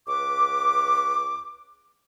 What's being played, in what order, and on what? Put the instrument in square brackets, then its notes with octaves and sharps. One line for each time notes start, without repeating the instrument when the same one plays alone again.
[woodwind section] C#2 B4 C#6 D6